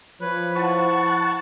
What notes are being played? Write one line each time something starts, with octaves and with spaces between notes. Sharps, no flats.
F3 B4 C#5
E4 F#5 A5 C#6